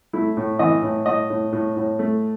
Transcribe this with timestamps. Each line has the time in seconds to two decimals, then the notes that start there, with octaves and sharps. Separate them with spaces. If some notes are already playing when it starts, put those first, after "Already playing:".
0.13 A3 E4
0.37 A2
0.59 E3 D#5
0.82 A2
1.06 A2 D#5
1.30 A2
1.52 A2
1.76 A2
1.99 A3